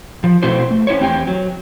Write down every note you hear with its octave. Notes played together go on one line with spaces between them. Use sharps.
F3
B2 A3 C4 E4 F#4 C5
A3
C#4 E4 C5 C#5
E2 C4 G4 G5 G#5
F#3